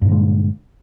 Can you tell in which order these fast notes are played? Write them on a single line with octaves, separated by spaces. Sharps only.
G2 A#2 D3 G#3